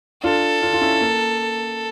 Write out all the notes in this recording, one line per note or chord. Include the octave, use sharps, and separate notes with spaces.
D4 F4 A4
D4 F4
F4
C#4 E4
A#3